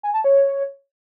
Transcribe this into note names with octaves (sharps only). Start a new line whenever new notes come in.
G#5
A5
C#5